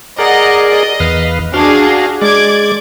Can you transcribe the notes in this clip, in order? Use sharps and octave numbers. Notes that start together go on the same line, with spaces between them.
G#4 A#4 D5 D#5 F#5 A#5
D#5
E2 B4 F5
D4 F#4 G#4 F5
G#3 D5 D6 G#6